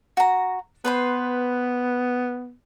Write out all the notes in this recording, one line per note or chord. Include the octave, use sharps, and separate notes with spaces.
F#4 A#5
B3 B4 C5 C6